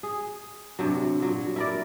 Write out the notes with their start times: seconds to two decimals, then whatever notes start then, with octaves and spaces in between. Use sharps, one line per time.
0.03 G#4
0.79 G2 C3 F#3
1.20 A#2 F#3
1.56 E4 A#4 D5